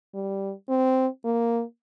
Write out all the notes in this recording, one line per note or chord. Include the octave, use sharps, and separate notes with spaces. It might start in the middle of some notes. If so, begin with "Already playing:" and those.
G3
C4
A#3